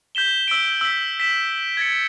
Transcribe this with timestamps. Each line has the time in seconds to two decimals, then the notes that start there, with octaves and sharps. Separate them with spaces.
0.15 G6 B6 E7 G7
0.48 E6 B6 D7
0.81 E6 B6
1.20 B6 E7
1.77 G#6 A6 C#7